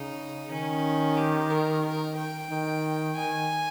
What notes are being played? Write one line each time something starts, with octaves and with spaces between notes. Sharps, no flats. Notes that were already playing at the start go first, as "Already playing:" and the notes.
Already playing: C#3 D#4
D#3 C#4
G4
A#4
A#4
G5
D#3
D#3 G#5